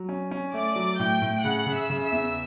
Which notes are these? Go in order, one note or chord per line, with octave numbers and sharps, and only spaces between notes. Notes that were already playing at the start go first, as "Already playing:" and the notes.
Already playing: F#3
C#4
C#4
A3 D5 D6
F#3
A2 G5 G6
A2
C#3 F#5 F#6
C#3
E5 E6
C#3
E5 E6
E2